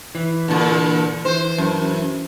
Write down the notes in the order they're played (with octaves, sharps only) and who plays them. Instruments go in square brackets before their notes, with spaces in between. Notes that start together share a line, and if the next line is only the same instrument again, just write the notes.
[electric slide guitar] E3
[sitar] A#2 D3
[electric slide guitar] E3 [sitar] C5
[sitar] F#2